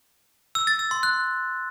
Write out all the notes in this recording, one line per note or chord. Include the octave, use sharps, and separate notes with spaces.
E6
A6
E6
C6
F#6